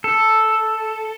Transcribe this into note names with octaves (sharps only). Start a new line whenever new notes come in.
A4